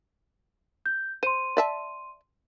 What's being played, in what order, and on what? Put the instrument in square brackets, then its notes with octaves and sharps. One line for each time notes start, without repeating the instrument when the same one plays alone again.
[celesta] G6
[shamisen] C5 [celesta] C6 D#7
[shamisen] D5 E5 A5